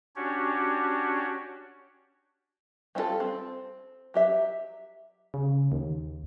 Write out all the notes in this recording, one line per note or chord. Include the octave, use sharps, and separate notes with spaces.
C#4 D4 F#4 G4 C#5
G3 C4 D4 F4 A4
C4
F#3 G4 E5
C#3
D#2